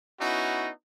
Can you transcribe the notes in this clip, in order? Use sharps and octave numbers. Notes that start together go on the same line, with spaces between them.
B3 C#4 D#4 E4 F#4